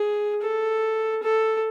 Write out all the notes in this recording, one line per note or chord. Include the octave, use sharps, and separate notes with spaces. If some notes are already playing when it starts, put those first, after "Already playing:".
Already playing: G#4
A4
A4